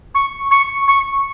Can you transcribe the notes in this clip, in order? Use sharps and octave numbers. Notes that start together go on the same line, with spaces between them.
C#6
C#6
C#6